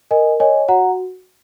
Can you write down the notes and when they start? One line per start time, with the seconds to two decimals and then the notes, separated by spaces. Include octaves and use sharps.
0.11 A#4 D#5 G#5
0.40 C#5 D#5 G#5
0.68 F#4 F#5 A#5